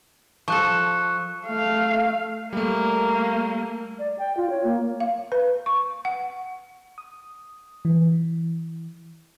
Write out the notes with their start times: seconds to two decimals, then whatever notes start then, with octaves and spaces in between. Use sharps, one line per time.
0.48 F3 A4 C#6 F#6
1.47 A3 F5
2.53 G3 A3 A#3
3.99 D5
4.18 G5
4.37 F4
4.50 C#5
4.64 A#3
5.00 F5
5.32 B4
5.66 C#6
6.05 F#5
6.98 D#6
7.85 E3